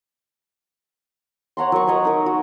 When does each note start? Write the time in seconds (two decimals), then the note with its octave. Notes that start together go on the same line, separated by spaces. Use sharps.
1.57 C#5 F#5 A#5 C6
1.72 F#3 A#4 C#6
1.87 B4 C#5 D#5 A#5
2.05 D#4 A#4
2.26 F#4